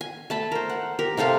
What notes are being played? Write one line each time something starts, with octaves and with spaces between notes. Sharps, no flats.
G#5
A3 A5 B5
A#4 C5
F#5
G4 A#4
C3 C4 A4 F5